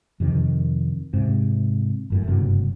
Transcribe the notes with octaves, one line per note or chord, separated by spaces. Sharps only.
F2 C3 D#3
G#2 C3
G1 F#2 A2
F#1 G2 C3 F#3